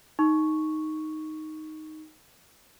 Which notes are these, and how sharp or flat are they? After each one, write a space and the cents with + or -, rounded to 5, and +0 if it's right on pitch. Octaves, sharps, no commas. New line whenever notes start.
D#4 +0 C#6 +0